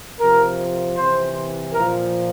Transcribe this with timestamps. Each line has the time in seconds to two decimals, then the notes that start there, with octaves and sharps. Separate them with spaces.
0.19 C3 F3 A#4
0.96 C3 E3 C5
1.73 A#2 F3 A#4